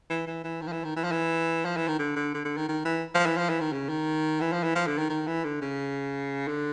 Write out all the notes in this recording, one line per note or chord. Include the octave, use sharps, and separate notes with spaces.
E3
E3
E3
D#3
F3
E3
D#3
E3
F3
E3
F3
E3
D#3
D3
D3
D3
D3
D#3
D#3
E3
F3
E3
F3
E3
D#3
C#3
D#3
E3
F3
E3
F3
D3
D#3
D#3
E3
D3
C#3
D3